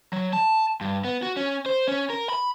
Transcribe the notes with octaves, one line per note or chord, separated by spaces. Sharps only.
F#3
A5
G2
B3
F#4
C#4
C5
C#4
A#4
B5